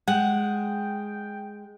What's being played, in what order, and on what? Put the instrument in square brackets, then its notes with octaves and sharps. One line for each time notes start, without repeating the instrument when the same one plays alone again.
[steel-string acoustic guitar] G#3 [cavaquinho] F#5 [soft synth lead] G5